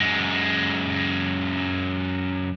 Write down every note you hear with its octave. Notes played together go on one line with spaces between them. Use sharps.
F#2 G#3